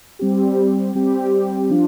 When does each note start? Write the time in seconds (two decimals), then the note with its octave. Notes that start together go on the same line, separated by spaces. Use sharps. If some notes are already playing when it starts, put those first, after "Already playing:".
0.19 G3 C4 G4
0.95 G3 C4 G4
1.70 F3 D4 F4